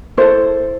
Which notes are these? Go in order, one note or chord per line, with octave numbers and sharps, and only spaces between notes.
E4 A4 C5